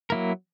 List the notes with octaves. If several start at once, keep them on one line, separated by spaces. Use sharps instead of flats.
F#3 A#3 E4 A#4